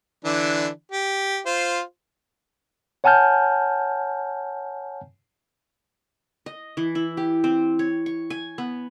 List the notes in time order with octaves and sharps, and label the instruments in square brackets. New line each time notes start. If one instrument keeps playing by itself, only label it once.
[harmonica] D3 E3 D4
G4
F4 C5
[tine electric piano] C#5 F#5 G#5 A5 F6 G6
[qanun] D#5
E3
E4
G4
C4
C#5
C#6
G#5
B3